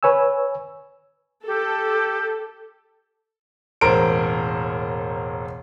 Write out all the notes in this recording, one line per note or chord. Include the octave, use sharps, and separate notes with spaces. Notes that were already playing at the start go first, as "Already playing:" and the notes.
B4 C#5 G#5 E6
G4 A4
E1 A1 A#4 C5 D7